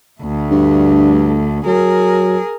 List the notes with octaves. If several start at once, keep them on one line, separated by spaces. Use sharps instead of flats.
D2 A3
G2
F#3 G#4 A#4